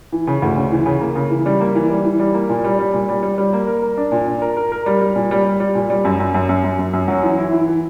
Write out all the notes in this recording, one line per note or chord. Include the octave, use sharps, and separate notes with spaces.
E3
C#3
D2
C#3
E3
C#3
A#3
C#3
E3
G3
A#3
E3
G3
E3
G3
A#3
A#2
G3
G3
A#2
G3
G3
G3
A#3
A#4
A#4
D4
A#2
D4
A#4
A#4
A#4
G3
G3
A#2
G3
G3
G3
A#2
G3
F#2
F#2
F#2
F#2
F#2
F#2
F#2
F#3
E3
E4
E3
E3